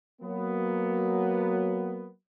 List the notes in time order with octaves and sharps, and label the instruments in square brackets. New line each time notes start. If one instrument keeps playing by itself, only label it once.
[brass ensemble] F#3 A#3 B3